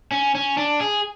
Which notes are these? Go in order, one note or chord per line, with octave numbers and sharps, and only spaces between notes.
C#4
C#4
D4
G#4